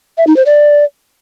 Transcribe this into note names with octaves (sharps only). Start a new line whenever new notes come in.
E5
D#4
C5
D5